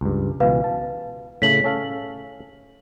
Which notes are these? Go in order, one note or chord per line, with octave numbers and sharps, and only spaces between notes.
C#2 G2
C#2 B2 E3 B4 F5
A5
A2 C#3 A3 B6 F#7
C#4 A4 F5